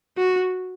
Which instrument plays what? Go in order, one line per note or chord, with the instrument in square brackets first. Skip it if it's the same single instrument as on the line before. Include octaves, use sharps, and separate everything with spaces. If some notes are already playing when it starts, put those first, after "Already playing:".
[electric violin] F#4